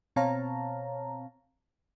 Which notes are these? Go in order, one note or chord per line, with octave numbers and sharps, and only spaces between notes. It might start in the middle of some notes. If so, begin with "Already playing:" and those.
B2 C4 C#5 F5 A5 A#5